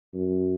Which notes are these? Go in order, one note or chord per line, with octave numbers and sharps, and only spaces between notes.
F#2